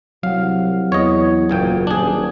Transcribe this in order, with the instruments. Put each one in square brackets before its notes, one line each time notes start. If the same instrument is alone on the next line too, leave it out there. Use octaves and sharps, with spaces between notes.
[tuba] C2 [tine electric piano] F#3 F#5 [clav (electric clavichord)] F5
[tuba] E2 [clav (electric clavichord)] C#5 D#5
[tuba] F#1 [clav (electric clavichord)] B1 A#2 G5
[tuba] D#1 [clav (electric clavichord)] D4 G#4